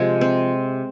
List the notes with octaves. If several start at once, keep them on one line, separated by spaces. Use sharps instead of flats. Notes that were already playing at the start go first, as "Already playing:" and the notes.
Already playing: C3 F3 G#3
C4